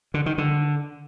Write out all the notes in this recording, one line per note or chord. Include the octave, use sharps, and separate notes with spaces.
D3
D#3
D3